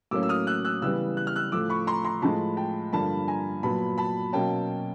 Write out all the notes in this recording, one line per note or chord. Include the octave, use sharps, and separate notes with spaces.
A2 F#3 A#3 C#4 D6 E6
E6
D#6 F6
E6 F#6
E6 F#6
C#3 E3 G3 B3 E6 F#6
F#6
F6
E6 F#6
A2 F3 A3 D6 E6
B5 C#6
A#5 C6
A#5 C6
A2 F3 G#3 A5 B5
G5 A5
G2 D3 F3 A#3 A5 B5
G#5 A#5
A#2 F#3 B3 A5 B5
A5 B5
B2 F#3 A#3 C#4 G5 A5